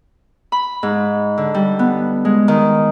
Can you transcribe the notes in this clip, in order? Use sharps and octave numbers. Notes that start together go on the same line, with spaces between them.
B5
G#2
D3
G3
B3
G#3
D#3